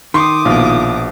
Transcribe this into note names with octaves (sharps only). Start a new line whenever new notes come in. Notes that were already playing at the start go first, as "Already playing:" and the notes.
D#3 C6 D6 D#6
A#1 B2 F4